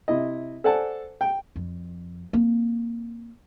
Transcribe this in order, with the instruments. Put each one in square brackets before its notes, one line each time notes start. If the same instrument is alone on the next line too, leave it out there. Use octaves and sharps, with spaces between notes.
[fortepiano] C3 E4 D#5
A4 C5 D5 F#5 G#5 A5
G5
[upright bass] F2
A#3 C4